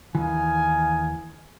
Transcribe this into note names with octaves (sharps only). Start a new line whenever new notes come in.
D#2 E3 D#4 F5 G#5